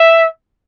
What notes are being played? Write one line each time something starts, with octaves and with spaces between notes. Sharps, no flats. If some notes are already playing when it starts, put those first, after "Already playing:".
Already playing: E5